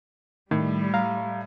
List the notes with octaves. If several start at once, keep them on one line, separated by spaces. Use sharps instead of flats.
A2 D#3 G3
F5 A#5